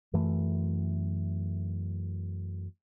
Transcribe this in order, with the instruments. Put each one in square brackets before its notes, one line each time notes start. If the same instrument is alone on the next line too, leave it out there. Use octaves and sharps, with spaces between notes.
[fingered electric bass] F#2 E3 A3